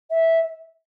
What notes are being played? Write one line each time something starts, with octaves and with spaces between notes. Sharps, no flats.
E5